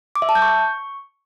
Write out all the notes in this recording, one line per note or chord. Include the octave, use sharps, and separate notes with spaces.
D6
E5
A5
G6
C#6